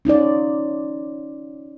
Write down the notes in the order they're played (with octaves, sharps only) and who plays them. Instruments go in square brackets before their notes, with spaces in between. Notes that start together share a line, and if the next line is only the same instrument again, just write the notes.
[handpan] C#4 D#4 F4 D5